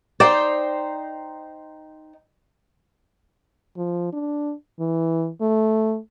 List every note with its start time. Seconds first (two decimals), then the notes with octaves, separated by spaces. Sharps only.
0.20 D#4 C5 D5 G5
3.77 F3
4.13 D4
4.80 E3
5.41 A3